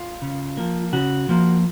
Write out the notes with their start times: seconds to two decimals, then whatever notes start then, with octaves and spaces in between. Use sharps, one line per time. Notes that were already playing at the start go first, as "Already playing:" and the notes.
Already playing: F4
0.22 C#3
0.57 F3 A#3
0.93 C#3 F#4
1.29 F3 A#3